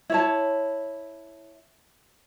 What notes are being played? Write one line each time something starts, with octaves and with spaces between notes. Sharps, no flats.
E4 C#5 A5